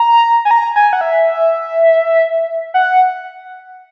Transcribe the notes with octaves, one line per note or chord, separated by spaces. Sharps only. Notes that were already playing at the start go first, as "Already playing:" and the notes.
Already playing: A#5
G#5
A#5
G#5
F#5
E5
F#5